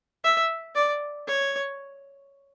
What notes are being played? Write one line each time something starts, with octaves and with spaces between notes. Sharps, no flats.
E5
D5
C#5